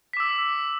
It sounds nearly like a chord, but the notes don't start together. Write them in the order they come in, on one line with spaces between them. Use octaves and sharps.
B6 D6 E6